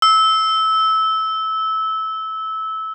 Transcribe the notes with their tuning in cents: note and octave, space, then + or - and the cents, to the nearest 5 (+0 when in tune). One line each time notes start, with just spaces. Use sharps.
E6 -20